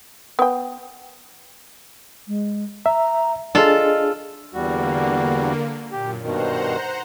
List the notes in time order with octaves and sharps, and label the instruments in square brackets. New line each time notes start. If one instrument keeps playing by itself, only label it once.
[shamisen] B3 G5
[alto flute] G#3
[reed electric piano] E5 [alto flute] A#5
[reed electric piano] D4 G#4 [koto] F4 A4 [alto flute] D#5
[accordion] E2 G3 F#4 [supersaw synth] D3 A#3
[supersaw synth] F#2 A#2 [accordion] G4
[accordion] G2 B2 D#3 [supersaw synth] C5 F#5 A#5